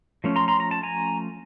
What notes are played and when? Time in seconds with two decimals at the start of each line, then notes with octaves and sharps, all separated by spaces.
0.24 F3 A3 C#4
0.36 A#5 C6
0.48 A#5 C6
0.60 A#5
0.71 A5
0.83 G#5 A#5